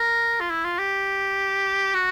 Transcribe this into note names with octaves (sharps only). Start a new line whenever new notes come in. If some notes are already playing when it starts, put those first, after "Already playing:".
Already playing: A#4
F4
E4
F4
G4
F#4